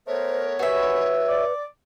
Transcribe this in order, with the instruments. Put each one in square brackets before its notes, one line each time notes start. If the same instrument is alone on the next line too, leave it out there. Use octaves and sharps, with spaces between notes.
[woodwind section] A3 B3 A#4 [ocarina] C5 [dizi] C#5
[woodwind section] D#2 G#5 B5 [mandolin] F#4 E5 [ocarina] B4
[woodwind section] D5